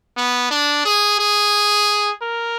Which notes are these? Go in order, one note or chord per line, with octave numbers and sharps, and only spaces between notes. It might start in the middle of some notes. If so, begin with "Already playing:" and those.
B3
D4
G#4
G#4
A#4